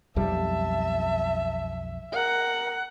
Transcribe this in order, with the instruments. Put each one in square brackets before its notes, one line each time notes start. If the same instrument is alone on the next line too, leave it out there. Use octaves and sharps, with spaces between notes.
[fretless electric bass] B1 F2 G3 [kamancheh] E5 [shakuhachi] A5
[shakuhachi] A#4 [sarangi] F#5